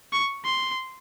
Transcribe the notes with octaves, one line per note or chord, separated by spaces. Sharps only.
C#6
C6